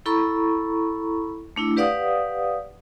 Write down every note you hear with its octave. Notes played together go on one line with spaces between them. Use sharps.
E4 A4 A#5 B5 C#6
A3 D4 E4
G4 B4 D5 F5 F#5 D#6